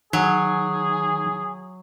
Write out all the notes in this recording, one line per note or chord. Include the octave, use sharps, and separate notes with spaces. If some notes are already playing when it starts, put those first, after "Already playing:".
D#3 F#3 G#4